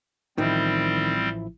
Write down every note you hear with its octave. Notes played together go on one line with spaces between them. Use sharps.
A1 D#3 F3 G3 C4 E4